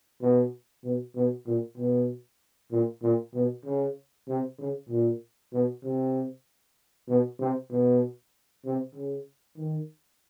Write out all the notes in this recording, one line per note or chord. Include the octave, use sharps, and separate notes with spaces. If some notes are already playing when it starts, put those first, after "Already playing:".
B2
B2
B2
A#2
B2
A#2
A#2
B2
C#3
C3
C#3
A#2
B2
C3
B2
C3
B2
C3
C#3
D#3